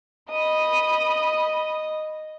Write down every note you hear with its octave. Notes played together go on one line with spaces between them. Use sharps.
D#5 B5 D#6